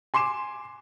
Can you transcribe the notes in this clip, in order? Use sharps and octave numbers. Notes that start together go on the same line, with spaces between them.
G#5 C6 D6 C7 E7